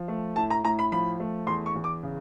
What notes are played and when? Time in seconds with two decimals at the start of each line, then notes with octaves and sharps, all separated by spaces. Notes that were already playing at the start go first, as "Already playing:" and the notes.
Already playing: F3
0.08 A3
0.36 A2 A5
0.50 A#5
0.64 A2 A#5
0.79 B5
0.92 F3 B5
1.20 A3
1.47 E2 C6
1.66 C#6
1.75 E2
1.84 D6
2.03 C#3